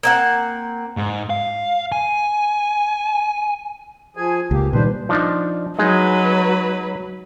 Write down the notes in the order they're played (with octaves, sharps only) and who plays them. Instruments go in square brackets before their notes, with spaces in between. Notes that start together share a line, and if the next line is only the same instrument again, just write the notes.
[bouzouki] A#3 C4 F#5
[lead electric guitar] G#2
F5
G#5
[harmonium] F3 G#4 G#5
[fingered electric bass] C#2 [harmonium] A#3 G4
[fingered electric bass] A#2 D#3 G3 [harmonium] D4 B4 C5
[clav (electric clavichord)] F3 D4 D#4
[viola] F#3 B4 [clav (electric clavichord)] G#3 D#4 G#4